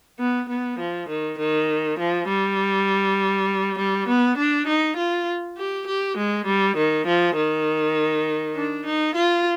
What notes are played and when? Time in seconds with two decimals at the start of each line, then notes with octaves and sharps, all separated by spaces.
0.19 B3
0.49 B3
0.79 F3
1.09 D#3
1.39 D#3
1.99 F3
2.29 G3
3.78 G3
4.08 B3
4.38 D4
4.67 D#4
4.97 F4
5.58 G4
5.88 G4
6.17 G#3
6.46 G3
6.77 D#3
7.07 F3
7.36 D#3
8.55 D4
8.86 D#4
9.15 F4